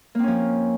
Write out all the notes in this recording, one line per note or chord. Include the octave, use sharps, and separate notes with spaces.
F3 A#3 C4 C#4